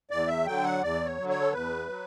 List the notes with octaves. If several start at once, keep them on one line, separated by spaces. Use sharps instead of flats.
E2 D5
E5
D3 F#3 G5
F#5
E2 D5
C#5
D3 F#3
C#5
A4
E2 B4
F#3